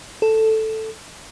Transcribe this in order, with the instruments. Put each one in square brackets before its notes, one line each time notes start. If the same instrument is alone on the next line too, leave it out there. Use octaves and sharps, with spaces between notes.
[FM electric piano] A4